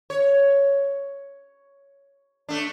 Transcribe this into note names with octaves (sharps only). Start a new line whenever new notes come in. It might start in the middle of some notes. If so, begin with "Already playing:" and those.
C#5
A3 D4